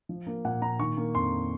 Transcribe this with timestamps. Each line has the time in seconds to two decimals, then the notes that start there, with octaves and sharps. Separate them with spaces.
0.09 F3
0.26 A#3
0.45 A#2 F#5
0.62 A#2 A#5
0.79 D#3 C#6
0.97 A#3
1.15 F2 C6